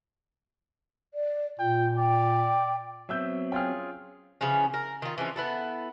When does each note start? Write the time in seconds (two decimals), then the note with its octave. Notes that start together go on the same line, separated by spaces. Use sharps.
1.14 D5
1.59 A#2 F4 G5
1.98 D5 G5
3.09 F#3 B3 C4 E5 E6 G6
3.52 C#4 F4 G#4 G5 F6
4.41 C#3 E3 F3 C#4
4.74 A#4
5.02 D#3 F4
5.18 E3 F3 G#3 C#4
5.36 B3 E4 A4